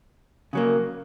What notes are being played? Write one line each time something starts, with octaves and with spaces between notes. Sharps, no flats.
C#3 F#3 A#3